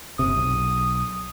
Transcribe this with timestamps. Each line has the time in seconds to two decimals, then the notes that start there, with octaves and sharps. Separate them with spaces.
0.19 F#1 C3 D#6
0.36 B1